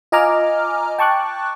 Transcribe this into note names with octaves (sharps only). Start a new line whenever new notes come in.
F4 D#5 G#5 A#5 D6 F6
G5 A5 C#6 D6 F#6